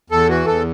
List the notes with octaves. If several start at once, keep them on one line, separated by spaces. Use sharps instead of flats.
E2 A4
E3 F#4
E2 A4